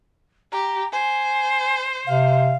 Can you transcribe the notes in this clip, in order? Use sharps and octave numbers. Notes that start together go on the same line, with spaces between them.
G4 A#5
C5 G#5
C3 F5